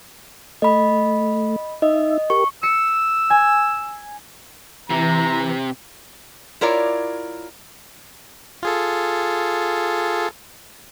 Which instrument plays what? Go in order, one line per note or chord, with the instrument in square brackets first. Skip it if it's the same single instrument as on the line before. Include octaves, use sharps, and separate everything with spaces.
[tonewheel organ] A3 [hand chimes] D#5 B5
[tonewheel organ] D#4 E5 [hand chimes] D#5
[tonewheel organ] G4 A#4 [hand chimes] C#6
[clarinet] E6 [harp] C#7
[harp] G#5
[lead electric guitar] C3 [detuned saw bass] E3 [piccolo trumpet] A#5
[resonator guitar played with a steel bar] E4 F4 A#4 C#5 D5
[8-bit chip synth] F4 G#4 A4